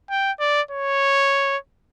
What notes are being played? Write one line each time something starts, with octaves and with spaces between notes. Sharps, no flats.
G5
D5
C#5